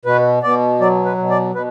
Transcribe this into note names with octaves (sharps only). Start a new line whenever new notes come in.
B2 B4
B2 D5
F#3 D5
B4
B2
D5
B2 B4